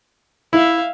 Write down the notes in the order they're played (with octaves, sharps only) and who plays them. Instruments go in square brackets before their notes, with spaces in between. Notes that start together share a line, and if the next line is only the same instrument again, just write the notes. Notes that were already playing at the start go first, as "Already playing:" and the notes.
[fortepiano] E4 [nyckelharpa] E5 F5